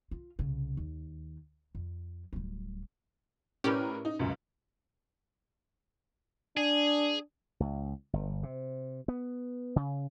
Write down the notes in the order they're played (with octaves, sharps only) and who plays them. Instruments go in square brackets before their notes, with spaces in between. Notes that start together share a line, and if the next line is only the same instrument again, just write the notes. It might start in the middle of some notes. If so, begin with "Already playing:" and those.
[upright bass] F4
C2 C#3
D#2
F2
D1 G3
[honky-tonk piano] A2 A#4 B4 [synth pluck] C#4 G4 D5
[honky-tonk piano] D#4
C#2 F#2
[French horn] D4 [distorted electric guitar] G#4
[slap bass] C#2
G1
C3
B3
C#3